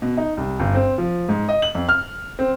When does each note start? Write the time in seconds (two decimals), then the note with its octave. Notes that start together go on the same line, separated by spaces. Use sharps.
0.02 B2
0.17 D#4
0.37 C2
0.60 G1
0.75 C4
0.98 F3
1.29 G#2
1.49 D#5
1.62 F#7
1.75 F2
1.89 F6
2.39 C4